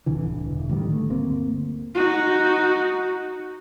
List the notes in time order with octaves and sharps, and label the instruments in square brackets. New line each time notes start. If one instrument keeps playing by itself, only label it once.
[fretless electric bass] D1 C2 D3 E3
E1
A1 D3 D#3 G3
A3
G1 D2 A#3 C4
[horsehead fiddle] D#4 F#4